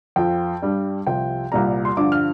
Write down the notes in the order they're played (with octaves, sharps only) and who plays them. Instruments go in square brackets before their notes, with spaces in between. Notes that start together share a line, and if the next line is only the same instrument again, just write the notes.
[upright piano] F2 F3 G5
G2 G3
C2 C3 F3 G5
C2 A#2 G3 A#5
C6
G2 D3 F3 D6
F6